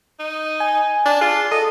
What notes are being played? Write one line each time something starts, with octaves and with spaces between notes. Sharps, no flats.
D#4
G#5
D4
F4 G#4
A4 D#5